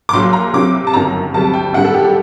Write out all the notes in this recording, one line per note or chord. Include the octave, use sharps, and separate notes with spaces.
D6
A#1 A#2 F#3 C6
A#5
C2 C3 F#3 D6
A5
G1 F#2 D#3 F#3 A#5
D2 C3 G3 A5
G5
A1 G2 D#3 G3 F#5
A4
G4
G4